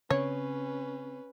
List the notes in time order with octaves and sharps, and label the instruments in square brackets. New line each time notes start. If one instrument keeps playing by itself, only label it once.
[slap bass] C#3 C4 [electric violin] C#4 B4 [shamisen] C#5